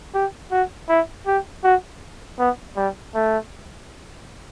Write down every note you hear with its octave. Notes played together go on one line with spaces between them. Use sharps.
G4
F#4
E4
G4
F#4
B3
G3
A3